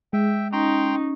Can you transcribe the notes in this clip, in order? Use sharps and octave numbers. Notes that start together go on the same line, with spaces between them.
G#3 E5 G5
C#4 D#4 G5 A#5 C6